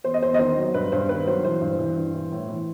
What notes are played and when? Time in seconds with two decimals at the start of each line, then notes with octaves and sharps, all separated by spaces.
0.04 E2 C5
0.14 D#5
0.22 E2 C5
0.34 D#5
0.39 D#3 C5
0.58 F#3
0.74 G2 B4
0.92 G2 C5
1.09 D#3 B4
1.27 F#3 C5
1.44 E3 C5
1.61 G2
1.79 E3
1.97 G2
2.14 E3
2.32 A2
2.49 E3